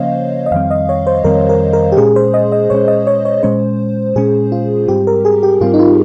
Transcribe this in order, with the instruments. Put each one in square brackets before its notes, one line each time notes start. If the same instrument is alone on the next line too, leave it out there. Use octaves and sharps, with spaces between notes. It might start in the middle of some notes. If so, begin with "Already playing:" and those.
Already playing: [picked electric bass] C#3 F3 A#3 C#4 [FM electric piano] C5 C#5 D#5 F5
[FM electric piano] D#5
[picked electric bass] F2 D#3 G3 C4 [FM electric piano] F5
[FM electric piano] D#5
C#5
C5
[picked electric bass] F2 D#3 G3 C4 [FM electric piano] A#4
[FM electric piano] A#4
A#4
G4
[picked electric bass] A#2 G#3 C#4 [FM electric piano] G#4
[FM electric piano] C5
D#5
D#5
[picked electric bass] A#2 G#3 C#4 [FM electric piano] C#5
[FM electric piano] D#5
C#5
C#5
[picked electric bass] A#2 G#3 C#4 [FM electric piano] C5
[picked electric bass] A#2 G#3 C#4 [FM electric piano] G#4
[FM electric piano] F4
[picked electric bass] G#2 G3 C4 [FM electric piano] G4
[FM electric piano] A#4
G#4
G4
[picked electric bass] G#2 G3 C4 [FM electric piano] F4
[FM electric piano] D#4
F4